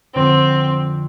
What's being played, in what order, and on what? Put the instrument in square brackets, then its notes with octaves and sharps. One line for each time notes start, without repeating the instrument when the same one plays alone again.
[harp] F2 D3 E7 [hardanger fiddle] C4